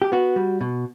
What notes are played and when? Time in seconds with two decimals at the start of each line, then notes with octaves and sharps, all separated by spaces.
0.02 G4
0.12 B3 F#4
0.36 G3
0.61 B2